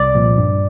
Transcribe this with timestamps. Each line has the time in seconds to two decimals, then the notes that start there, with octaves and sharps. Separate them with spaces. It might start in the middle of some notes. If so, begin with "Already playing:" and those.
Already playing: C2 D5
0.15 A#2 F3
0.37 G2